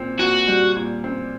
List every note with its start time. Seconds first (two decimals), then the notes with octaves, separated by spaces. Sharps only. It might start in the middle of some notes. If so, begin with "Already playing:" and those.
Already playing: A#2 C4
0.19 A#2 F#4
0.48 G3
0.76 A#2
1.04 C4